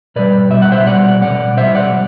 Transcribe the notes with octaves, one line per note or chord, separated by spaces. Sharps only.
B2 G3 B4 D5
B2 G3 E5
F#5
C5 E5
B2 G3 D5 F#5
B2 G3 D5 F#5
B2 G3 C5 E5
D5 F#5
G3